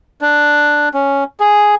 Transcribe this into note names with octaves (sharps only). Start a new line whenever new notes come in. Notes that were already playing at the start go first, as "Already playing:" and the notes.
D4
C#4
G#4